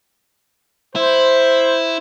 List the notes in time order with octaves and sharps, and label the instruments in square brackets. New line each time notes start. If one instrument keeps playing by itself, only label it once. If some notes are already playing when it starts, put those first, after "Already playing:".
[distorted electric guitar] E4 [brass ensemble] C5